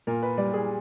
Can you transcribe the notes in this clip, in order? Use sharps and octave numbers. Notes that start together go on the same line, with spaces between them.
A#2 A#4
B4
G3 D5
G#4